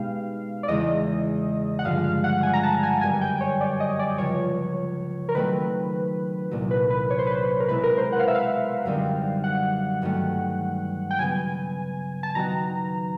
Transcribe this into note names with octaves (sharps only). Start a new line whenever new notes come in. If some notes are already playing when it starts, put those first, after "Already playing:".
Already playing: B2 G#3 B3 D#4 G4 F5
D5
E2 C#3 E3 G#3 D#5
F#5
G2 D3 F3 G#3 F5
F5
F#5
G#5
A#5
A5
G#5
F#2 D3 G3 B3 G#5
G5
C#5
D5
D#5
D5
C#2 C#3 F3 C#5
A#4
D#3 F#3 A3 C4 B4
C2 A#2 F#3
B4
B4
C#5
C5
B4
C5
A#4
B2 G#3 C4 E4 B4
A#4
C5
F#5
F5
E5
F5
F#2 D3 G3 C4 D#4
F#5
G2 D#3 F#3 A3 C#4
G5
C#3 F#3 B3 G#5
A5
D#3 F#3 B3 D#4 F#4 A#5